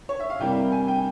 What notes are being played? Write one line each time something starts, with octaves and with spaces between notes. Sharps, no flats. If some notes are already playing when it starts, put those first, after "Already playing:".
C#5
E5
F5
C3 G3 A#3 E4 G5
G#5
G5